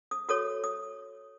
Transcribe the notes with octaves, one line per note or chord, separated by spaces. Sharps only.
D#6
F#4 A4 C#5 D#6
D#6